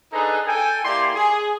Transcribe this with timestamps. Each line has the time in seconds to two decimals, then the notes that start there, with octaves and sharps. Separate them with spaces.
0.12 D4 D#4 G#4 A4 B4 A#5
0.46 A4 G5 G#5
0.84 A#3 E4 G4 D5 C6
1.14 G#4